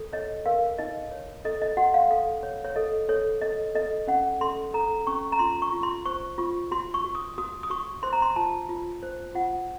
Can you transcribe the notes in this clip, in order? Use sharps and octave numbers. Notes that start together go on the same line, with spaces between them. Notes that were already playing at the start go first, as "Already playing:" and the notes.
Already playing: A4
C#5 D#5
A#4 F5
D#4 D#5
C#5
A4 D#5
D#5
F#4 F#5
F5
A4 F5
C#5
C#5
A4 D#5
A4 C#5
A4 D#5
A4 D#5
C#4 F#5
A4 C6
A4 A#5
C#4 C#6
A#5
F4 C6
C#6
F4
C6
C5 C#6
F4 C#6
F#4 C6
C#6
F#4
D#6
F#4 D#6
D#6
F#4 C#6
C5 C6
A#5
C6
F4 A5
F4
C5
F4 F#5